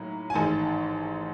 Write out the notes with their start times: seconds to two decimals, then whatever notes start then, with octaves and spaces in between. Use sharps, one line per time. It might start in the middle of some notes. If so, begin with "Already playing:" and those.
Already playing: A2 F#3 A#3 D#4 A#5
0.30 G#5
0.34 A1 G#2 D#3 A5